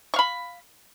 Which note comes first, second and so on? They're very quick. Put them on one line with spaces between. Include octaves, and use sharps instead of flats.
C#6 F5 B5